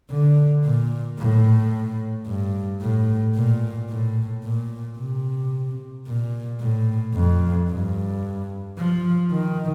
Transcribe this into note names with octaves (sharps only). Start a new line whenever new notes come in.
D3
A#2
A2
G2
A2
A#2
A2
A#2
C3
A#2
A2
F2
G2
F3
D#3